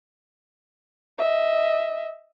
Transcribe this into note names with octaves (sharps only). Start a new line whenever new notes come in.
D#5 E5